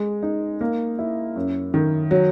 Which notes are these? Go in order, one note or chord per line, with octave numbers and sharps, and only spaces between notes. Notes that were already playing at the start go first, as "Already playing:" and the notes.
Already playing: G#3
D#4
A#3
E4
F#2
D#3
F#3